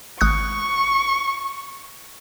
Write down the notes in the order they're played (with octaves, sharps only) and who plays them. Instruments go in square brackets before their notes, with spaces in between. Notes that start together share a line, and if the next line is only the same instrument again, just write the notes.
[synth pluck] G#1 D#6 F#6 [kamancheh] C#6